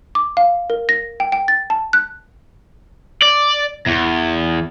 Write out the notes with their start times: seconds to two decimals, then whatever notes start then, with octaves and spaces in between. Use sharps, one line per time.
0.15 D6
0.37 F5
0.70 A#4
0.89 A#6
1.20 G5
1.32 G5
1.48 A6
1.70 A5
1.93 F#6
3.22 D5
3.87 E2